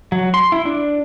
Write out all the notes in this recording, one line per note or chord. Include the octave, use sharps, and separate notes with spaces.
F#3
C6
E4
D4